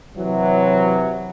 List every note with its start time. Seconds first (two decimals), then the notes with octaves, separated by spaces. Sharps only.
0.15 C3 E3 F#3